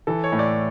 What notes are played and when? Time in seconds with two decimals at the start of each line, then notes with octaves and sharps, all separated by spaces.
0.07 E3 A4
0.24 C#5
0.32 A2
0.39 D5